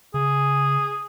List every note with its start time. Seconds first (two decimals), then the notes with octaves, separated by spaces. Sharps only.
0.14 C#3 G#4